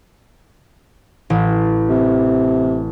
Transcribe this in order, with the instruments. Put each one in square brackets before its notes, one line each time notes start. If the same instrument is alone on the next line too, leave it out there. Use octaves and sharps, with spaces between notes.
[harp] A1
[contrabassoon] C3